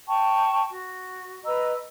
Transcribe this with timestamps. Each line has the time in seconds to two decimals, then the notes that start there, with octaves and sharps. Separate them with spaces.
0.07 G5 A5 C#6
0.69 F#4
1.44 B4 D#5 A#5 E6